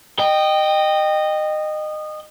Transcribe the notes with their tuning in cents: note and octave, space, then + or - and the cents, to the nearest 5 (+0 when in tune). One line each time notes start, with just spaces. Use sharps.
D#5 -20 G5 +0